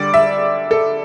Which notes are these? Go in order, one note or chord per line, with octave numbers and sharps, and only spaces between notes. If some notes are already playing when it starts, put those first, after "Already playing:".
Already playing: D3 G3 D5
E5
A4